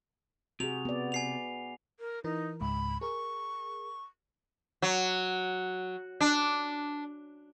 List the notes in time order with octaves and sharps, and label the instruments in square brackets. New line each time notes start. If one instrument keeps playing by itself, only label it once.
[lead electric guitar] C3 [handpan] F#4 G#4 [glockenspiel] F7
[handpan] B3 D5
[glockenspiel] G#5 C7 F7
[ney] A#4
[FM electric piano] E3 A#4 [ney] D#4
[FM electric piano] C#2 G#2 [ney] B5
[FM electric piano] G#4 A#4 [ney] C#6
[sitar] F#3
D4